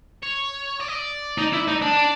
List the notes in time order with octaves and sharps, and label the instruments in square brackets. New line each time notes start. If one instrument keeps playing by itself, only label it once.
[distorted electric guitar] C#5
D5
D#5
D5
[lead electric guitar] D#4
E4
D#4
D4
[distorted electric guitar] D5